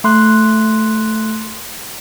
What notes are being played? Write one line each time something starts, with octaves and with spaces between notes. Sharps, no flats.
A3 C6 F#6